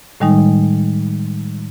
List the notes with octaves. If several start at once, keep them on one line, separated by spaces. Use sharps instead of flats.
A2 D#3 G3 G#3 D#4